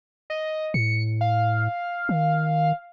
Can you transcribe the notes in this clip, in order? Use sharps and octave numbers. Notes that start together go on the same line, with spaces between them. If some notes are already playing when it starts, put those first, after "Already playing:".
D#5
A2 C#7
F5
D#3